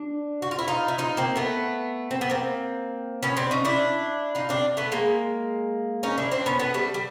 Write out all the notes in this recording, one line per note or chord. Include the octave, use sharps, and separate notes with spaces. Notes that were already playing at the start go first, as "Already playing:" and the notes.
Already playing: D4
F#4
F4
E4
D#4 F4
E4
D#4 F4
A#3 C4
A3 B3
C4
B3
A#3 C4
B3 C#4
C4 D4
C#4 D#4
D4 E4
D#4 F4
C4 D4
A3 B3
G#3 A#3
C#4 D#4
D4 E4
C4 D4
B3 C#4
A3 B3
G3 A3
G3